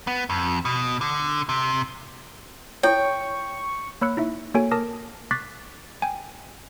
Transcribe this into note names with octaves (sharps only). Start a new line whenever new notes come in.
B3
F2
B2
D3
C3
E4 A4 C#5 G5 C#6
A#3 C#5 B5 E6 F#6 C#7
D#4 E4 E5
A#3 F#4 A4 C#5 G#5 D7
A#4 A5 D6 D#6 F6 A#6
C#6 D6 F#6 A6 B6 C7
G5 G#5